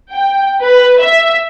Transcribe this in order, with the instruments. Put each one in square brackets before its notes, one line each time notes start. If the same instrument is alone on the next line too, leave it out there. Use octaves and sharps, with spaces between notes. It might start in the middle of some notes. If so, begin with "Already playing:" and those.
[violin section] G5
B4
E5